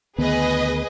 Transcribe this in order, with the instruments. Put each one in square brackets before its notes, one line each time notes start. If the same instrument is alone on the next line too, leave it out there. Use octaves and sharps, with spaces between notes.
[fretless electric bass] D2 D#3 B3 [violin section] G#4 B4 D#5